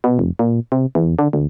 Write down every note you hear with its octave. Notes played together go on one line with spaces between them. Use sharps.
B2
F1
A#2
C3
E2
D3
D2